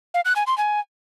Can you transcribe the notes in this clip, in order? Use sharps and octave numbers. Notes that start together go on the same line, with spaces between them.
F5
F#6
G#5
C6
G#5